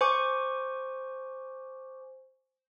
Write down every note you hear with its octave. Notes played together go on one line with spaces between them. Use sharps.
C5 G#5 C#6 D6